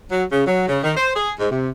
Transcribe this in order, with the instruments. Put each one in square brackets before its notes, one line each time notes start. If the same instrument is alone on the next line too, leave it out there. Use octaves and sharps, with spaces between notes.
[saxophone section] F#3
C#3
F#3
C#3
D#3
C5
G#4
G#2
C3